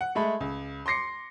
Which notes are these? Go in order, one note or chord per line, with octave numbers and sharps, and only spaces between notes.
F#5
G#3 A3 G#4 B5
C#2
C6 D6 A#6 C7 C#7